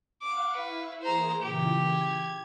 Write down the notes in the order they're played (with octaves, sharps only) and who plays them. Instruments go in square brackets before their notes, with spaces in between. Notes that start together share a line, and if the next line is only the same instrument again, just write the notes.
[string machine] F5 F#5 C#6 [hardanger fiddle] D6
[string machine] E4 [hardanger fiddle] B4
[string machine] E3 A#3 G#4 [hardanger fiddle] C5 A#5
[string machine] A#2 C#3 E3 [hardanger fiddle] G4
[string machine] G#6